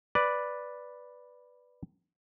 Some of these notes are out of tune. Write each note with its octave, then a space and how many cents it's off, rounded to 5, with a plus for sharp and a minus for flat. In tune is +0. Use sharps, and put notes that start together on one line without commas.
B4 +0 D5 +0